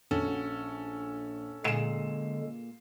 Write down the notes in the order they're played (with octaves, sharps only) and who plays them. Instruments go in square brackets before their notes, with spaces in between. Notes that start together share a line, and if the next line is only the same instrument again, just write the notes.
[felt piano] A#1 [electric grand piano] C#4 A4 [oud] F#4
[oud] A#2 G#4 [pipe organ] D3 G#3 [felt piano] C7 E7